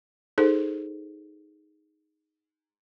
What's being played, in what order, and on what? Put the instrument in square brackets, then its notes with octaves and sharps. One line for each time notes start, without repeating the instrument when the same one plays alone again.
[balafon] D#4 G#4 A4 C5